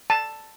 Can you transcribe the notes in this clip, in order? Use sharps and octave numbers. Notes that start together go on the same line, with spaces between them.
A5